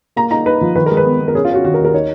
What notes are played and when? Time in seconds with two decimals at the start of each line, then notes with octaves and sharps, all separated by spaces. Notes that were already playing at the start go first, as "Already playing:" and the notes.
0.16 A#3 A#5
0.31 D#4 A#5
0.46 D#4 B4
0.61 F3
0.75 D#3 B4
0.86 G#3 A#4
0.97 B4
1.05 B3
1.20 B3
1.28 A#4
1.35 C#4 G#4
1.45 F4
1.50 C#4 F#4
1.64 D#3 F#4
1.74 A#4
1.79 D#2
1.85 A#4
1.94 D#4 C#5